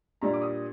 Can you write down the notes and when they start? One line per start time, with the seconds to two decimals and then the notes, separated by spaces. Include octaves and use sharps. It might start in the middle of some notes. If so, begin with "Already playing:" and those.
0.21 A#2 G3 D4 A#5
0.34 D6
0.42 D#6